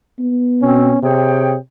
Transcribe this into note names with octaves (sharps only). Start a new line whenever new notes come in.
B3
B2 C4 C#4
C3 G#4 C#5 G5